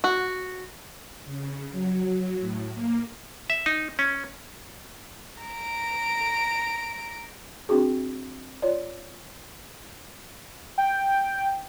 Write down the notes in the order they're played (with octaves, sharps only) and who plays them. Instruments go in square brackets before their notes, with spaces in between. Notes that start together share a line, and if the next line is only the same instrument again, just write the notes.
[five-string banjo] F#4
[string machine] C#3
F#3
A2
A#3
[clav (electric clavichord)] E5
D#4
C#4
[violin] A#5 D7
[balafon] C4 D4 F#4 G#4
F4 C#5 D5
[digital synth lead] G5